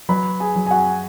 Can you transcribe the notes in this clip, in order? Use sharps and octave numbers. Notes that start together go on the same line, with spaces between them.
F#3 B4 B5
G#4 G#5
F#3
G#5
F#4 F#5